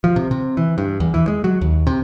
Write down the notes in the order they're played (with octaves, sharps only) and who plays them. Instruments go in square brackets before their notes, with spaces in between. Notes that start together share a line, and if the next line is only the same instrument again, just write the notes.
[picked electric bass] F3
C3
C3
E3
G2
E2
E3
G#3
F#3
D#2
C3